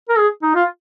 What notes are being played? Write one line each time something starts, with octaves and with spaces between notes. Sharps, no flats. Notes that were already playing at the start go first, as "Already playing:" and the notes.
A#4
G#4
D#4
F4